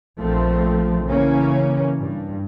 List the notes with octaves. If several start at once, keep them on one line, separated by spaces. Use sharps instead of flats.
A#1 F3 A3 C4
C#3 E3 A#3 C#4
G2